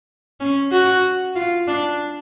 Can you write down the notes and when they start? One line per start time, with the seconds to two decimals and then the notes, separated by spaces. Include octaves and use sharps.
0.40 C#4
0.72 F#4
1.36 F4
1.68 D4